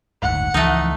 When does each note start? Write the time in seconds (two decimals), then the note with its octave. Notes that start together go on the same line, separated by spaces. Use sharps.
0.23 F#1 D2 G#2 F#5
0.54 C#2 E3 F3 A3 D#4